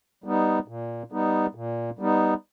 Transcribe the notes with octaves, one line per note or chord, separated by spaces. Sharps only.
G3 B3 D#4
A#2
G3 B3 D#4
A#2
G3 B3 D#4